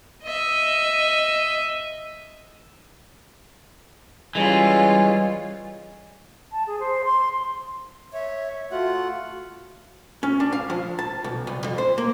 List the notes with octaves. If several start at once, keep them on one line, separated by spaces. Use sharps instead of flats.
D#5 E5
E3 G3 G#3 C#4 F4
A5
G#4
C5
C6
C#5 E5
A3 F4 F#4 F#5
C#4
D4
F5
F3
A5
B1
C2
F2
C5
A#3